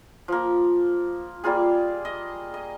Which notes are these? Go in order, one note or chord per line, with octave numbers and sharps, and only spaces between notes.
F3 A#3
G3 A#3 F4 G#4
D#5
D#5